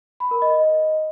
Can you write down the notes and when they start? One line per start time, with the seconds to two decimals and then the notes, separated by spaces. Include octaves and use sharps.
0.20 B5
0.31 A#4
0.42 D#5